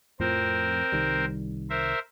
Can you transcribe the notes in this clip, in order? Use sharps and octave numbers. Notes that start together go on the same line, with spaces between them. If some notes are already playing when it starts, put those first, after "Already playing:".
F2 A2 F3 C4 A#4 C5
C2 D#3 G3
A#4 C5 E5